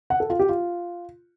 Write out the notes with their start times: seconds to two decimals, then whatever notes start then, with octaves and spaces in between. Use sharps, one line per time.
0.10 F#5
0.20 A4
0.30 F4
0.39 G4
0.49 F4